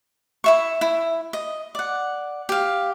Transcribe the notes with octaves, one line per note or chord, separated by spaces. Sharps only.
E4 E5 C#6
E4
D#5
D5 F#5
G4 F5